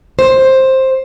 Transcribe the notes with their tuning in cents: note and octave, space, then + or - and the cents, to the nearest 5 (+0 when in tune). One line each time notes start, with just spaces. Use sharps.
C5 +10